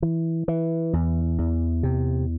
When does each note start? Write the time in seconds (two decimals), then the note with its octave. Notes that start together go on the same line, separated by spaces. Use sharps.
0.02 E3
0.48 E3
0.93 E2
1.39 E2
1.83 C3